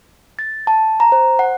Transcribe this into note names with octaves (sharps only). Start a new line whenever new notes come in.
A6
A5
A#5
C5
F#5